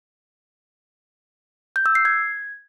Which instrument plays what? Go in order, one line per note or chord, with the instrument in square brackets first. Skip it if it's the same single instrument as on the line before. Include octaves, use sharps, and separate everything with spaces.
[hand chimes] G6
E6
C7
G#6